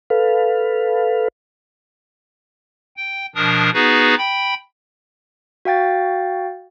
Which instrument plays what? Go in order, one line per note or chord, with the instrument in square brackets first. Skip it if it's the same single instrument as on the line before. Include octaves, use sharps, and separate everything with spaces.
[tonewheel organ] A4 B4 F5
[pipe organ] G5
B2 F3 D4 A#4 D#6
B3 D#4 F#4 G#4 B4
G5 B5
[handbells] F#4 F5 G5 A6